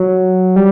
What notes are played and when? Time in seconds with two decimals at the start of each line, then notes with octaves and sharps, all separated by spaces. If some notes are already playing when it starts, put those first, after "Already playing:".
Already playing: F#3
0.56 G3